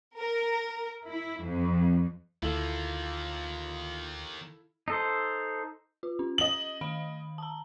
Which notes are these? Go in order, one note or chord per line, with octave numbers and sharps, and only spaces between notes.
A#4
E4
F2
D2 D#3 A#3 E4 F4 A4 F5
D#4 A4 C5
F4
C#4
D#5 F#7
D#3 F5 B5
A5 A#5